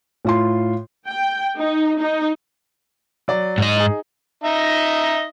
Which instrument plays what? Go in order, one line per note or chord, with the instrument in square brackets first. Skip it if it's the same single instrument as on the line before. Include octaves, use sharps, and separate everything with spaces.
[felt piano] A2 F4 C6
[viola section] G5
D#4
D#4
[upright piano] F#3 D5
[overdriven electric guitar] G#2 D#5
[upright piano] D#4 G#4
[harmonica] D#4 D#5 E5